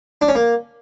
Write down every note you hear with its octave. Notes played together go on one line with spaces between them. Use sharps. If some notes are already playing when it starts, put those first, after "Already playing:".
D4
C#4
A#3